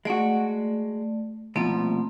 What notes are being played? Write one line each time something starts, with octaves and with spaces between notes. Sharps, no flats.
G#3 A3 F#4 D5
C2 B2 F3 A3 A#3 C4